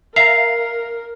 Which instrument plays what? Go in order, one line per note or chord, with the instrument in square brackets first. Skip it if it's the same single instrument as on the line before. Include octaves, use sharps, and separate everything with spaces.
[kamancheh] A#4 [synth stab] E5 F5 A#5 [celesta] C7